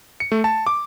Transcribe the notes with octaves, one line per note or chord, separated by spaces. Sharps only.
C#7
A3
A5
D6